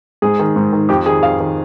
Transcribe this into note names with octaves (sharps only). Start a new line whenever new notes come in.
G#2 G#4
D#3
G#2
D#3
F2 G4
D#3 G#4
F2 F5
D#3